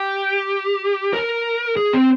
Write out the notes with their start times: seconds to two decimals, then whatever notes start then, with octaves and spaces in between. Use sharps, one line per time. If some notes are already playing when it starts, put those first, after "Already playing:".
Already playing: G4
1.13 A#4
1.77 G#4
1.93 C4